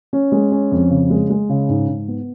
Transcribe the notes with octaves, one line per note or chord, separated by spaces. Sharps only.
C#4
G#3
C#4
F2
C#3
G#3
G#3
C#3
G#2
G#2
B3